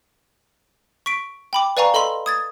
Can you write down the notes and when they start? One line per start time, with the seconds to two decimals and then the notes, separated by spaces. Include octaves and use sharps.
1.06 C#6 B6 D7
1.53 G5 B5 D6
1.77 B4 D5 F5 G#5 A#5 C#6
1.94 A4 D#5 B5 C6 F#7
2.26 D#6 G#6 A6